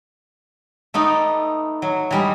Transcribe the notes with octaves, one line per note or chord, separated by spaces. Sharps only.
A3 B3 D#4 D5
F#3
E3 G3 G#3